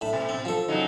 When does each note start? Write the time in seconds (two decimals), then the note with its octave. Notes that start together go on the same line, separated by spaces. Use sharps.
0.01 A2 A5 B5
0.13 B2
0.29 C4
0.45 F3 A4
0.68 C#3 F#3 D#4